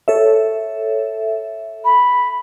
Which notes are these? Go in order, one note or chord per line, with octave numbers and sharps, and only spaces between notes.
A4 C#5 E5
B5